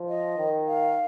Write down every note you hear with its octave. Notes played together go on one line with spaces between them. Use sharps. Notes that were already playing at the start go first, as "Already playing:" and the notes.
Already playing: F3
D#5
D#3
F5